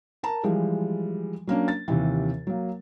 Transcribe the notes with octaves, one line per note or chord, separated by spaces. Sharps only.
A#4 A5 A#5
E3 F3 G3 G#3
F#3 A#3 C#4 D4
A6
D#2 C3 E3
F#3 A#3